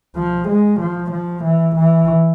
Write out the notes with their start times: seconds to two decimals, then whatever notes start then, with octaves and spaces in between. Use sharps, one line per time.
0.16 F3
0.48 G#3
0.80 F3
1.11 F3
1.44 E3
1.76 E3